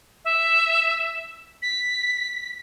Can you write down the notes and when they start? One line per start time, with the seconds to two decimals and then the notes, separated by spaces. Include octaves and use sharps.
0.25 E5
1.62 B6